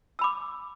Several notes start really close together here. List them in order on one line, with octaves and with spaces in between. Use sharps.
E6 B5 D6